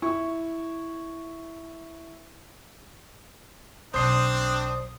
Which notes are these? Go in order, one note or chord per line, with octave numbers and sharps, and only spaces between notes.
E4 C#6
B1 C4 D4 C5 C6 D#6